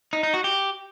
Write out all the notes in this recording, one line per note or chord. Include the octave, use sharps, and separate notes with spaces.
D#4
D#4
F#4
G4